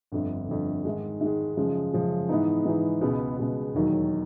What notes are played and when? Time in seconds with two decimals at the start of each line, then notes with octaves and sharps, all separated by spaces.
0.12 G1 F2 D3
0.48 G1 F2 D3
0.84 G#2 D#3 G#3
1.21 G#2 D#3 G#3
1.57 F#2 C#3 F3 G#3
1.93 F#2 C#3 F3 G#3
2.29 G#2 E3 G#3 B3 D#4
2.65 G#2 E3 G#3 B3 D#4
3.01 C#2 B2 G#3 B3
3.37 C#2 B2 G#3 B3
3.74 E1 D#2 D#3 F#3